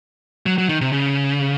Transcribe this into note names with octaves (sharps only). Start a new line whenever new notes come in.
F#3
F#3
D#3
C3
C#3